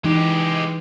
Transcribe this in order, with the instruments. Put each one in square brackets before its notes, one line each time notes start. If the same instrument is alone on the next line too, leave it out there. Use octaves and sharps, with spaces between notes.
[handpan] E3 D#4 [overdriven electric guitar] G#3 G4